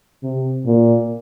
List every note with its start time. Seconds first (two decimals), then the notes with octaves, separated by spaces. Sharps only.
0.23 C3
0.66 A#2